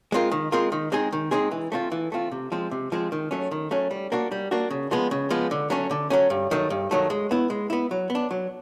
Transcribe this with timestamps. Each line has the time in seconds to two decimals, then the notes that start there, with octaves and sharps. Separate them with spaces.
0.12 G#3 C4 F4 A#4
0.31 D#3
0.52 G#3 C4 F4 A#4
0.72 D#3
0.92 G#3 C4 D#4 G#4
1.12 D#3
1.31 G#3 C4 D#4 G#4
1.51 E3
1.72 A3 C4 F4
1.92 E3
2.12 A3 C4 F4
2.32 C3
2.52 F3 G#3 C4
2.71 C3
2.92 F3 G#3 C4
3.12 D#3
3.31 F#3 A3 C#4
3.51 D#3
3.71 F#3 A3 C#4
3.91 G3
4.12 A#3 D4 F#4
4.32 G3
4.51 A#3 D4 F#4
4.70 C#3
4.91 F3 G#3 B3
5.11 C#3
5.30 F3 G#3 B3
5.51 D3
5.70 F#3 A3 C#4
5.91 D3
6.10 F#3 A3 C#4
6.30 G2
6.51 D#3 F#3 A3
6.70 G2
6.91 D#3 F#3 A3
7.10 G#3
7.31 B3 E4
7.50 G#3
7.70 B3 E4
7.91 F#3
8.10 B3
8.15 D4
8.31 F#3